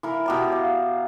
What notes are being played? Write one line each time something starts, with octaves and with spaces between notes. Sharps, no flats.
E3 A#4
B2 G4 A#5
F5